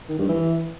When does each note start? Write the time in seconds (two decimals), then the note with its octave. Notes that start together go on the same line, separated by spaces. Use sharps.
0.09 D#3
0.19 G2
0.29 E3